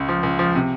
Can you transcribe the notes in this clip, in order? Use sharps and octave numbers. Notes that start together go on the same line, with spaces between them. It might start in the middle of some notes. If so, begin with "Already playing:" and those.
Already playing: C#2
F3
C#2
F3
C3